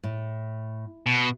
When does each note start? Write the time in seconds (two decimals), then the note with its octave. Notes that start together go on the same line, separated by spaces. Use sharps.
0.03 A2
1.06 B2